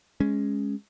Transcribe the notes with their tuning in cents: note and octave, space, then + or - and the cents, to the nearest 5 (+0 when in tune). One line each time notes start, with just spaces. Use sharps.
G#3 +0 C#4 +0